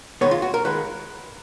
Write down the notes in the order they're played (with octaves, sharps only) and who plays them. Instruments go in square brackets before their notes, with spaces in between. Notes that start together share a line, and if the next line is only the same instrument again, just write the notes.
[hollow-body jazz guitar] D#3 G#3 B3 C#5
F4
F#4
A#4
D#3 G#3 B4